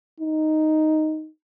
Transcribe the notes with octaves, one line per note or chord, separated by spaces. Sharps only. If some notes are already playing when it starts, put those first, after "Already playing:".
D#4